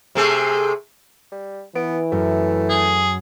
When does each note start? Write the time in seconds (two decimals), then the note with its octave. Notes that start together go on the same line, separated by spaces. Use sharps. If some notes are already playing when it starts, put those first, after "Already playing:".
0.15 C3 A3 G#4
1.32 G3
1.75 E3 B3 D7
2.12 F#2 A3
2.69 G#4